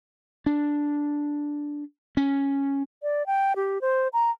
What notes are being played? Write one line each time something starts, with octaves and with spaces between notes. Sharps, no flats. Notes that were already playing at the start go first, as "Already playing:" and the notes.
D4
C#4
D5
G5
G4
C5
A#5